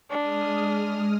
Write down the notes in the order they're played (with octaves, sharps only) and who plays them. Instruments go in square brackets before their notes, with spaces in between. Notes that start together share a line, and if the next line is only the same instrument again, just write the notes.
[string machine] G#3 D#6 F6 [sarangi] D4